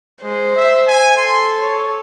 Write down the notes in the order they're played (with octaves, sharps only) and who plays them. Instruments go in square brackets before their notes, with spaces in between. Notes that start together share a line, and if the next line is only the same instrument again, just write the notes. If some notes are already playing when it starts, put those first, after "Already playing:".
[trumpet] G#3 [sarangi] C5
[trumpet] E5
G#5
[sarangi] A4 [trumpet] C6
[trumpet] C#5